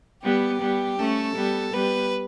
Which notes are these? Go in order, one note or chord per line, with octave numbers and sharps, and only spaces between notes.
G3 B3 G4
G3 B3
A3 C#4 A4
G3 B3
G3 B3 B4